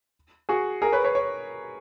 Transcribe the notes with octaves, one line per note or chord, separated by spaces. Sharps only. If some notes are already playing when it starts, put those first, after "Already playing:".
F#4 G#4
G#4 A#4
B4 C#5
B4 C#5
C#5